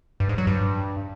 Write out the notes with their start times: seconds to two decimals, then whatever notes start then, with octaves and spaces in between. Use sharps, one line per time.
0.20 G2
0.29 G#2
0.38 F#3
0.47 G2